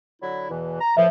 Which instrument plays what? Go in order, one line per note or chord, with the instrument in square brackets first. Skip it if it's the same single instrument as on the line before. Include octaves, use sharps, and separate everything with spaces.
[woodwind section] D3 F#3 E4
E2 B2 E3
A#5
[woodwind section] A2 E3 F3 [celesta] E5